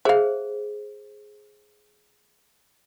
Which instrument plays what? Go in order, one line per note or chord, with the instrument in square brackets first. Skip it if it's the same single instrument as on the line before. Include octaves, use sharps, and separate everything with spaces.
[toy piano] G#4 C5 [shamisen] E5 F5